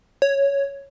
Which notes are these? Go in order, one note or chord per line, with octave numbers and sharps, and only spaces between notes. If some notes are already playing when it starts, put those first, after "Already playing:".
C#5